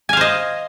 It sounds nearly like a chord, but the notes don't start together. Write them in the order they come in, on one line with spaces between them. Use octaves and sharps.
G#5 F5 C5 D#5